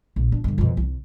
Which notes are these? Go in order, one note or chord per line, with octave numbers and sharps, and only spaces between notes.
A#1
D4
G2 D3
F2 B2
C2